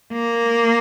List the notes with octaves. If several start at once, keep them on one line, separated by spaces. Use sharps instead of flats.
A#3